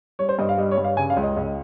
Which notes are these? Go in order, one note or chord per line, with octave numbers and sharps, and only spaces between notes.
G3 C#5
C5
G2 D#5
F5
G3 D#5
C#5
G2
F5
C#3 G#5
F5
C#2
D#5
C#2